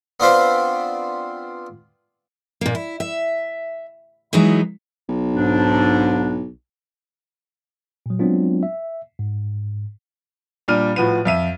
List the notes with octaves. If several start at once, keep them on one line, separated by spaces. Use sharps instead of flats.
B3 C4 D4 F4 B4 C5
A#2 A#3
E4
E5
E3 F#3 G#3 B3 D#4
B1
G#2 D4
A#2 F#3
F#3 G#3 B3 C4 D4 F4
E5
G#2
A#2 G3 D4 F6 D#7
A2 F3 F#4 B4 D#7
F2 E5 D#7